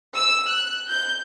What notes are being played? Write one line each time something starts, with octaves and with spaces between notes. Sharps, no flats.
E6
F#6
G6